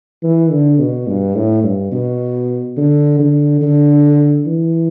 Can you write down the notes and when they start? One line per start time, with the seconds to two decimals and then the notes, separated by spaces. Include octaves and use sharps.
0.23 E3
0.51 D3
0.79 B2
1.08 G2
1.36 A2
1.63 G2
1.92 B2
2.77 D3
3.19 D3
3.62 D3
4.46 E3